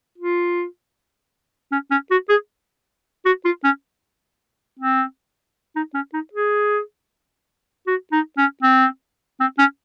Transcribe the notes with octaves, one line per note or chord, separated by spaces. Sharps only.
F4
C#4
C#4
F#4
G#4
F#4
F4
C#4
C4
D#4
C#4
D#4
G#4
F#4
D#4
C#4
C4
C4
C#4